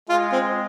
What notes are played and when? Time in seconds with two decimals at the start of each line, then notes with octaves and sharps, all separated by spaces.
0.09 G#3 F4
0.32 C4